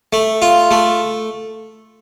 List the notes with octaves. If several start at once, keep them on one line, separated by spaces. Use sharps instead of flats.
A3
F4
A3